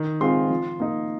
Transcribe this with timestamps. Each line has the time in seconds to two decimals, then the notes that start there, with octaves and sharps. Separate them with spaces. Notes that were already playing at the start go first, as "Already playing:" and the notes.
Already playing: D#3
0.21 G#3 C4 F4 C6
0.50 F3
0.80 A#3 D#4